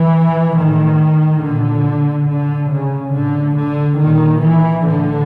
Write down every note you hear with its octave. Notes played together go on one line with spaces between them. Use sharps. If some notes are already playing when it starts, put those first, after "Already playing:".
Already playing: E3
A2 D#3
A#2 D3
A2 D3
C#3
A2 D3
D3
A#2 D#3
E3
A2 D3